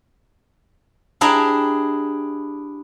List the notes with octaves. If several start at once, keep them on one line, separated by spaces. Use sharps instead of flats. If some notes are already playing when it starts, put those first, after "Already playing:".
D4 E4 G4 G#4 D5 A#5